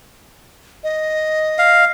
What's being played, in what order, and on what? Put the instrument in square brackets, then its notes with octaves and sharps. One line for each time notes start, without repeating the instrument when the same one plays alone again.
[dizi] D#5
[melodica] F5